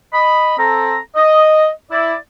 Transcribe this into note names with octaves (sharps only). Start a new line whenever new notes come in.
D#5 B5
C4 A4 A#5
D#5
E4 D5